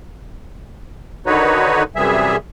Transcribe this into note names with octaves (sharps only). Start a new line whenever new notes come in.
D3 D#3 D#4 F#4 B4 C#5
F#2 C3 E3 G3 G#4 E5